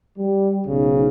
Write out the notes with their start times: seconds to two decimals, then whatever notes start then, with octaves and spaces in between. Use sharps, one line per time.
0.17 G3
0.66 B1 G#2 C#3